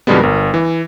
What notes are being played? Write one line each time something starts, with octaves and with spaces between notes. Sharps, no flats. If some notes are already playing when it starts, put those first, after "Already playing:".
F2 B2 D3 G3 G#3 B3
G1 A#4
E3